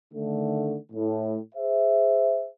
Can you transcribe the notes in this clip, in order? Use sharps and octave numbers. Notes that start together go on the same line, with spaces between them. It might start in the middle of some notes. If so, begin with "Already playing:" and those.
D3 D#3 A3
A2
G#4 C5 E5